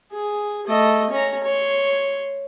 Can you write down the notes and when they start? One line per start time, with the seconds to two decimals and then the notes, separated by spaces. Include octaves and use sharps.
0.12 G#4
0.67 A3 D#5
1.10 C#4 A#5
1.43 C#5 C6